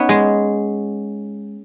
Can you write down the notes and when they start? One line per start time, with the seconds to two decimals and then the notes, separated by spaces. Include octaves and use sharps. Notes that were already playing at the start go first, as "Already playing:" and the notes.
Already playing: B3 C#4 D#4
0.09 G#3